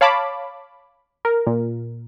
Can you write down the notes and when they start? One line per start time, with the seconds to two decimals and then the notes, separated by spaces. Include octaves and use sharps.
0.01 C#5 F5 A5 B5 D6
1.25 A#4
1.47 A#2